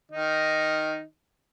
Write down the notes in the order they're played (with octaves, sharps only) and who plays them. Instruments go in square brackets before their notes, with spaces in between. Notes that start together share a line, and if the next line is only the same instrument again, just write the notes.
[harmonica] D#3 D#4